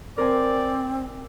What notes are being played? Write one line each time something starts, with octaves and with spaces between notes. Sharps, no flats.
C4 A#4 C5 D5 G#5